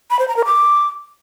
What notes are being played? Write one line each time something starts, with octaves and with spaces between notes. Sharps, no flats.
B5
C5
A#5
A#4
D6